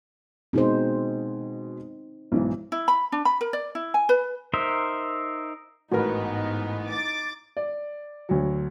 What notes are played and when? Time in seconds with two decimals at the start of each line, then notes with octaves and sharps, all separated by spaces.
0.53 B2 G#3 C4 D#4 C5
2.32 B1 G#2 E3
2.72 E4
2.88 B5
3.12 D4
3.25 B5
3.41 A#4
3.53 D5
3.75 E4
3.94 G#5
4.09 B4
4.53 D#4 A#4 C5 E5
5.92 A1 G#2 B3 D#4 F#4 A#4 B4
6.89 D6 A6
7.57 D5
8.29 D2 F#3